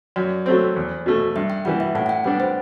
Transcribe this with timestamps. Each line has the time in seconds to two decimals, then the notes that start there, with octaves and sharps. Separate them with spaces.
0.16 F#2 D5
0.46 F#3 A3 C4 C5
0.76 E2
1.06 B2 A3
1.36 G2 E5
1.50 G5
1.65 E3 G3 F#5
1.80 E5
1.95 A2 F#5
2.06 F#5
2.09 G5
2.24 G3 B3 D4 F#5
2.40 C5